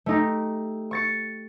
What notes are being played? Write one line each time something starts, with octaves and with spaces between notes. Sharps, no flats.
A3 D#4 G4
C#6 A6 C#7